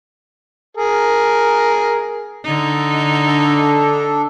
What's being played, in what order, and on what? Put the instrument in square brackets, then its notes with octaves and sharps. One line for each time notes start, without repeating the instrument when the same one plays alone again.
[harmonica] G#4 A#4
[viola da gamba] D3 D#4
[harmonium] D4 A4